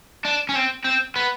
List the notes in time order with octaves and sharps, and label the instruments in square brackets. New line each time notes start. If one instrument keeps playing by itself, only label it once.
[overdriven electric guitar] D4
C#4
C4
C4
B3